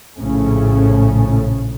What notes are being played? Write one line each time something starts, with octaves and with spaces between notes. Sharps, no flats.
A#1 A2 C#3 A3 C#4